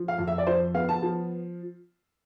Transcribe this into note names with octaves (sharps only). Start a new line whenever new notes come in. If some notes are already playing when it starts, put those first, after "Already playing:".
Already playing: F3
F5
F2
E5
D5
F3 C5
B3 F5
A5
F3